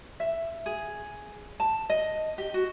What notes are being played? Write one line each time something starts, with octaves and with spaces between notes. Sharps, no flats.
E5
G#4
A5
D#5
G4
F#4